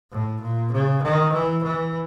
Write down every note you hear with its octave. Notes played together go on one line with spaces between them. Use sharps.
A2
A#2
C#3
D#3
E3
E3